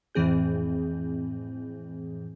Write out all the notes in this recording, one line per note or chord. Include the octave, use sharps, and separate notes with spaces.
F2 A2 E3 C4 G#4 G6